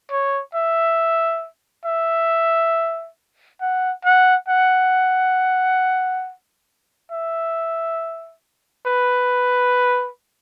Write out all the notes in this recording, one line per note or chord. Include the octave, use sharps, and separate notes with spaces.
C#5
E5
E5
F#5
F#5
F#5
E5
B4